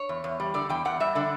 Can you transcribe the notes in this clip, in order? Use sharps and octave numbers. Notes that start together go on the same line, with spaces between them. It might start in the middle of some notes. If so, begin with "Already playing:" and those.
Already playing: C#5
E2
E2
G3
D3 D5
E2 G5
E2 F#5
G3 E5
D3 D5